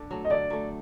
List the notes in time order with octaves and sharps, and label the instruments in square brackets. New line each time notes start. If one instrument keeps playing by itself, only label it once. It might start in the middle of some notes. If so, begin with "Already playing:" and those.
Already playing: [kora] D3 D4
F#3 A3
[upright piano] D#5
[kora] D3 [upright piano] D5
[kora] F#3 A3